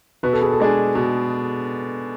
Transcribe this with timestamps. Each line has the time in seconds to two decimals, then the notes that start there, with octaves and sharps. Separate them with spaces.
0.23 B2 B4
0.33 A4
0.42 G#4
0.52 A4
0.60 G#3 D4 G#4
0.95 B2 G#4